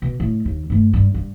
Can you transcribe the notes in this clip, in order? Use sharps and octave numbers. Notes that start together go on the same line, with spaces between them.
B2
A2
D#2
G2 A3
G2
G2